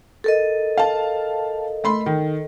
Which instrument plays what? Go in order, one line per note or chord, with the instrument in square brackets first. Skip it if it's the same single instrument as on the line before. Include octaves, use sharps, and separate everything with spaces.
[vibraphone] A4 A#4 D#5
[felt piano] F5 A5
A3 B5 C6
D#3